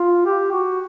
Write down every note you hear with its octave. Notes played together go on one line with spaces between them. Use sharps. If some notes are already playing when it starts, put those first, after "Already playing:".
Already playing: F4
G4
F#4